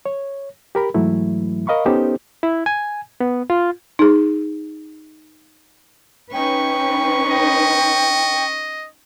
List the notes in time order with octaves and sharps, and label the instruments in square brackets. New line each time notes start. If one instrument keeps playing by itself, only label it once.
[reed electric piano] C#5
G4 A#4 B5
G#2 E3 F#3 A3 E4
A#4 D#5 F5 B5 C#6
B3 C#4 D#4 G4 A4 C5
E4
G#5
B3
F4
[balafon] D#4 G#4
[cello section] C#4 D#4 B4 [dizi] G5 [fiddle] C#6
[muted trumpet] D#5 [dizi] G5